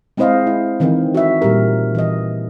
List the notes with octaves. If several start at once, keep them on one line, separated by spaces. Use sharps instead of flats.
G#3 C4 E4 C5 D#5 F5
E4
D#3 E3 C4 D#4 A#4
F#4 E5
A#2 G3 G4 A#4
E3 D#5